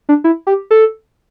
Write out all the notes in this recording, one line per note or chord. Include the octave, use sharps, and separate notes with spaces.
D4
E4
G4
A4